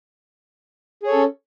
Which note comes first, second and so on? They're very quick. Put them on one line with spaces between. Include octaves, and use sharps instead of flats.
G#4 C#5 A4 C#4